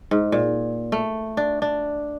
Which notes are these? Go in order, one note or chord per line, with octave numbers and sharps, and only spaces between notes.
G#2
A#2
A3
D4
D4